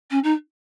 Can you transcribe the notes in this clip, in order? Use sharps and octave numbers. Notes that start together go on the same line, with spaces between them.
C#4
D#4